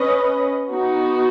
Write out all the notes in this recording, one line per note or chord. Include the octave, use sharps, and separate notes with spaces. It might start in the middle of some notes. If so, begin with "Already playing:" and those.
Already playing: C#4 B4 D#5
B3 D#4 F#4